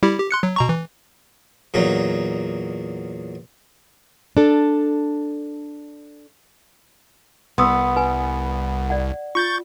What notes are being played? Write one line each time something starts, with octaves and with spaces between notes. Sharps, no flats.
G3 E4 G4
G4
C6 F#6 C#7
F#3
B2 A#5 C#6
E3
E2 A#2 F#3 D#4
D4 A4
C2 B3 C6 D#6 E6
B4 G#5
D5 F#5
F4 C#6 G6 A6